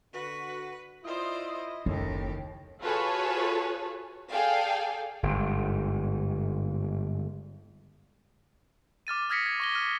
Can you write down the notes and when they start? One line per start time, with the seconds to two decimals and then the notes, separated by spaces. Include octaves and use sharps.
0.14 D3 F#4 B4
1.04 E4 F4 C5 D5 D#5
1.86 F#1 D#2 A2 G4
2.81 F4 F#4 G#4 A4 B4 C#5
4.31 G#4 A4 D5 F5 G5 G#5
5.23 G1 G#2
9.07 D6 F6 A6 D#7
9.29 D#6 F6 G#6 A#6 B6 C#7
9.46 G#6
9.60 C#6 A#6 G7
9.75 F6 G#6 D#7